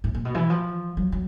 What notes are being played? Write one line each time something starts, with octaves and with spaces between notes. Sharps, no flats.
A2
A#2
B2
E3
F3
F#3
F#3